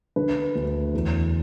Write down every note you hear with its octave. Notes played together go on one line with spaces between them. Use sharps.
D3 B4
D2
E2